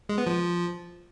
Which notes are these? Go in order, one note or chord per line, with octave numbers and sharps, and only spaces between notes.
G#3
B3
F3